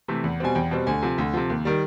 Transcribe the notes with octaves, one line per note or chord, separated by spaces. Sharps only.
C3 E3 A3
E2
B2 G3 C4 G#5
E2 G5
B2 G3 C4
D2 G#5
C3 F3
D2
C3 F3
D#2
D#3 G3